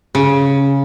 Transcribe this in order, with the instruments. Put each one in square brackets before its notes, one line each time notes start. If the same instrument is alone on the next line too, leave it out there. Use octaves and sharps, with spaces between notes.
[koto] C#3